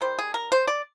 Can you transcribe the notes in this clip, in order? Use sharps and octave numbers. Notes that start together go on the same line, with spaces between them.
D#3 G3 C5
G#4
A#4
C5
D5